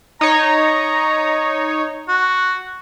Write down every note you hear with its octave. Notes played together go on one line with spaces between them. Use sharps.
D#4 C#5 A#5
F#4